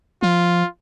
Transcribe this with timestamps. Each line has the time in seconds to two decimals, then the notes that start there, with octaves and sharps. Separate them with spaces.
0.23 F3 F4